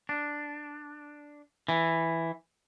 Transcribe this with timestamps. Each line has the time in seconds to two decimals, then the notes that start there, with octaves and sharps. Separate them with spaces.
0.09 D4
1.68 E3